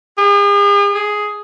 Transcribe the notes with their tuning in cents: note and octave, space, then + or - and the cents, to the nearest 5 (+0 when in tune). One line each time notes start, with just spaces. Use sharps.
G#4 -45
G#4 +5